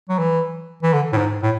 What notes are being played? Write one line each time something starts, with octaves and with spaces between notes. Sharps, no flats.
F#3
E3
E3
D3
A2
G#2
A2